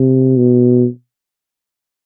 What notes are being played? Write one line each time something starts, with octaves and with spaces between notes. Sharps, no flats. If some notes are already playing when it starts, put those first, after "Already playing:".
Already playing: C3
B2